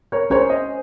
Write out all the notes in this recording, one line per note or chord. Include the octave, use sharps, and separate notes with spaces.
A#4 C#5
C#4 G#4 A#4 C5 C#5
C5 D#5